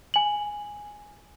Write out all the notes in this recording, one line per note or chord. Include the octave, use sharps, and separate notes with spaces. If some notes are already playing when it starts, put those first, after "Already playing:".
G#5 F#7